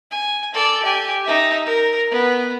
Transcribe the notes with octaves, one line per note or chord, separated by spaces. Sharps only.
G#5
A4 D5
G4 G#5
D#4 E5
A#4
B3